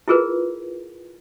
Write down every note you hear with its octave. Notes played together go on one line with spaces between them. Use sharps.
E4 F4 G#4 A#4 B4